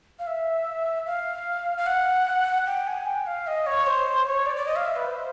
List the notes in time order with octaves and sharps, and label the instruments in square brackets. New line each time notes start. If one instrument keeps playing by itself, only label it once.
[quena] F5
E5
F5
F5
F#5
G5
G#5
G5
F5
D#5
C#5
C5
C#5
D5
D5
D#5
F5
E5
B4
C5